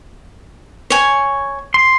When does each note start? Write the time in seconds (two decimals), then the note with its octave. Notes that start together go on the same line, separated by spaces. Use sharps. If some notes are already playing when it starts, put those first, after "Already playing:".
0.90 C#5 G#5
1.74 C6